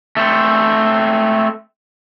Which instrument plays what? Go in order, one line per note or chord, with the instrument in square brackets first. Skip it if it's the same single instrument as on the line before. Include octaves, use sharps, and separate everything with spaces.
[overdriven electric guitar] A3 C4